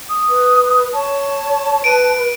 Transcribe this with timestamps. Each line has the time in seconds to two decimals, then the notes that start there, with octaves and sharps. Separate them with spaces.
0.09 D#6
0.29 B4
0.93 C#5 A5
1.84 B4 D7 D#7